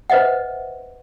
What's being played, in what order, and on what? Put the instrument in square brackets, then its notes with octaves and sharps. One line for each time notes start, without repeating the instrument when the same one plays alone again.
[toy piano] B4 C5 D#5 E5 F#5